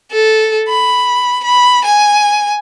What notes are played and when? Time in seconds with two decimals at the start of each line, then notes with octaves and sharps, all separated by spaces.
0.12 A4
0.69 B5
1.44 B5
1.85 G#5